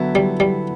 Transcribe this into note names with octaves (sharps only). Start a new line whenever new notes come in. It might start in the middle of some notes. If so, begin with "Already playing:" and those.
Already playing: D3 F#3 B3 E4
G3
G3